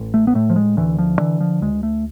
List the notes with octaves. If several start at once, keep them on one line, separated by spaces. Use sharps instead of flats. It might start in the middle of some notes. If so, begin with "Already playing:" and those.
Already playing: A1
A3
B3
A2 A3
F3
G#3
D2 E3
F3
D3 E3
F3
D2 G#3
A3